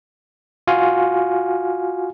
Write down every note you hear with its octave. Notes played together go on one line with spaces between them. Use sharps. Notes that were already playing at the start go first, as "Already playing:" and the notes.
F4 F#4 F5 G#5